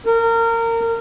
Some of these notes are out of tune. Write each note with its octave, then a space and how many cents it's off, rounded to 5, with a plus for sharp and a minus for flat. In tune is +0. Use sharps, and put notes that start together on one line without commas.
A#4 -25